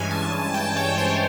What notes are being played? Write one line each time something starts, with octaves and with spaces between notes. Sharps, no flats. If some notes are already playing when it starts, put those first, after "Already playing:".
Already playing: G2 E3 G#3 C#4 G#5
A5
A5
G5
C#5
C5